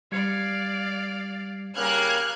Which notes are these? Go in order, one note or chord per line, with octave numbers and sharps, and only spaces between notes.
G3 D5 F5 G#6 C#7
C#3 G3 A#3 F6 F#6 G#6